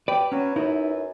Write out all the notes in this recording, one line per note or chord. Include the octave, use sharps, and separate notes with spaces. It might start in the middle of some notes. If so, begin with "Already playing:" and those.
G4 B4 D5
F#3 C#4
F#2 D#4 E4